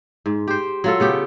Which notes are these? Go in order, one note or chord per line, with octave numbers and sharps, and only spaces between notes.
G#2
G4 C5
F#3 F4 A4
C#3 B3 G4